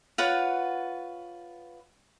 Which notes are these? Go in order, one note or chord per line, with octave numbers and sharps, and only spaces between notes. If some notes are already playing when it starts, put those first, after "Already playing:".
F4 B4 C#5 F#5